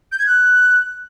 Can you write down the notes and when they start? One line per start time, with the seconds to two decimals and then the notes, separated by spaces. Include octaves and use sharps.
0.12 G6
0.19 G#6
0.26 F#6